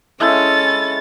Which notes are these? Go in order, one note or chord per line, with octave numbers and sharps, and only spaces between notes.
G#3 C#4 E4 A4 A6